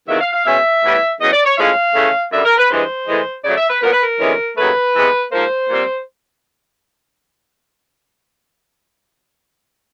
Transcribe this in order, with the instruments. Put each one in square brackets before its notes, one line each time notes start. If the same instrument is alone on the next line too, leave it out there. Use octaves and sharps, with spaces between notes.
[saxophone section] E2 C3 D#3 F#3 A#3 E5
F5
F5
B2 G#3 C#4 E5
A2 E3 G3 B3
E2 C#3 F#3 D#5
D5
C#5
A2 F3 G#3 C#4 F5
C#3 E3 A3 C#4
F#2 D3 G3 E5
A#4
B4
G2 E3 G#3 C5
A2 E3 G#3
C#3 F#3 A3 D5
E5
B4
A#2 F#3 B3 A#4
B4
A#4
D2 C3 E3 G#3 C#4
D#2 C#3 F#3 A3 B4
C3 E3 G#3 B3
G#2 F3 A#3 C5
A#2 G3 C4